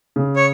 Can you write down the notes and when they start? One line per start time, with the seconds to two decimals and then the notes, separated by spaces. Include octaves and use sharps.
0.16 C#3
0.36 C#5